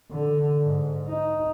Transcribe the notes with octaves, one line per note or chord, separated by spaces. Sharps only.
D3
G#2
D#4